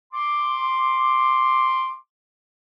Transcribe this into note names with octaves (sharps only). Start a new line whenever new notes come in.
C6 D6